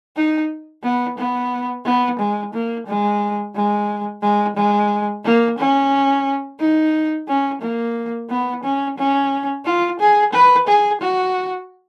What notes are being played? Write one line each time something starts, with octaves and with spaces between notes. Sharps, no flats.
D#4
B3
B3
B3
G#3
A#3
G#3
G#3
G#3
G#3
A#3
C#4
D#4
C#4
A#3
B3
C#4
C#4
F4
G#4
B4
G#4
F#4